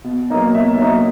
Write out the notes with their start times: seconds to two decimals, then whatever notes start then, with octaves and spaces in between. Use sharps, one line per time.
0.04 B2
0.30 F#3 A#3 D#4
0.54 B2 E5
0.78 F#3 A#3 D#4